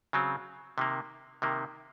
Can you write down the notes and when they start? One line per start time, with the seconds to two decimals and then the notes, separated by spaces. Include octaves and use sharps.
0.13 C#3 F#3 C4
0.78 C3 D#3 A#3
1.42 C3 D#3 A#3